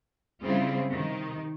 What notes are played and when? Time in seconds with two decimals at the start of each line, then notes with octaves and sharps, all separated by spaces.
0.43 C#3 G3 C4 E4 F4 G#4
0.90 C3 D#3 D#4